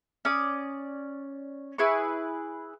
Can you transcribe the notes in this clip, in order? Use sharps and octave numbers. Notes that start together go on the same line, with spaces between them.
C#4 D5 D#6
E4 G#4 B4 C#6